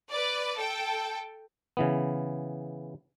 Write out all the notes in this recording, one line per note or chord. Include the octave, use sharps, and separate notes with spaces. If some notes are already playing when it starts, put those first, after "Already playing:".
B4 D5
A4 G5
C#3 E3 B3